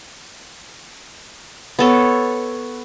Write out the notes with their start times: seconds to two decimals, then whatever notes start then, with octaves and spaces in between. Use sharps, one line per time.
1.79 B3 A4 C#5